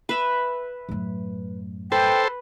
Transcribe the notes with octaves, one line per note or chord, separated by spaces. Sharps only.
B4 E5
F#2 A2
A4 B4 C5 G5